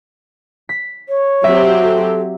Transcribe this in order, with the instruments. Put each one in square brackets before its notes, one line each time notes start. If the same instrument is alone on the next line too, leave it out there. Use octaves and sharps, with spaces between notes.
[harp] B6
[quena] C#5
[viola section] F#3 C4 G4 [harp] E5
[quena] A4